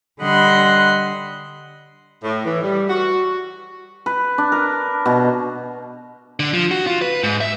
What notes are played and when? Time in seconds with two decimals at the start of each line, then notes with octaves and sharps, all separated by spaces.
0.20 D3 G3 D#5 F#5 B5 C6
2.24 A2
2.46 E3
2.63 G3
2.90 F#4
4.06 B4
4.38 D4
4.52 A#4
5.06 B2
6.40 D3
6.53 F3
6.71 F#4
6.87 F4
7.02 B4
7.23 G#2
7.41 E5